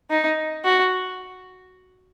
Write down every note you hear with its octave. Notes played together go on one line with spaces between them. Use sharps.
D#4
F#4